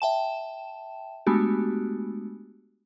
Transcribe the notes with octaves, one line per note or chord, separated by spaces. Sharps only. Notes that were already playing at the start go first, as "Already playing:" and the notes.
E5 G5 A5 E7
G#3 A3 B3 D4 F#4 G4